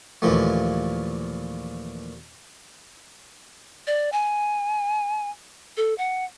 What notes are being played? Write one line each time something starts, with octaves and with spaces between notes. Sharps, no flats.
D#2 A#2 E3 F3 A3
D5
G#5
A4
F#5